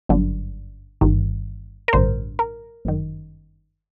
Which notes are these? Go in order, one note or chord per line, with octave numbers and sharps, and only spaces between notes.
G1 F#2 D3
G1 G2 D#3
A#4
A1 G2 D3 C5
A#4
G1 F#2 D#3